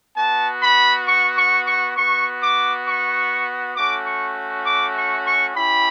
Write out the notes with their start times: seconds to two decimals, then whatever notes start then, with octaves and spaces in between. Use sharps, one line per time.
0.16 B3 F#4 A5
0.62 B5
1.06 C#6
1.37 C#6
1.66 C#6
1.96 B3 F#4 C#6
2.42 D6
2.86 C#6
3.76 A3 C#4 F#4 D6
4.05 C#6
4.66 D6
4.96 C#6
5.25 C#6
5.55 C#4 E4 G4 B5